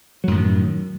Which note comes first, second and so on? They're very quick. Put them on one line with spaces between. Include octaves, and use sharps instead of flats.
F#3 F#2 A2 D#3